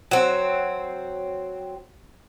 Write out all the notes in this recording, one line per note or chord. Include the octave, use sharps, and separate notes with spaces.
F#3 C4